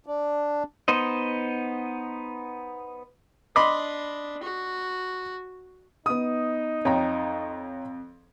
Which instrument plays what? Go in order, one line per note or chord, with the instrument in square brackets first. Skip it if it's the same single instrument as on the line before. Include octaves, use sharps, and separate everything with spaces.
[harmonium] D4
[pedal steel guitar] B3 D#4 C5 D#5
[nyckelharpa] D4 [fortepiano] D#5 B5 C6 [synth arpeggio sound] D6
[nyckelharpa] F#4
[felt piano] B3 D#6 [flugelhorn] D#4
[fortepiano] F2 [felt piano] C#5 G5 A#5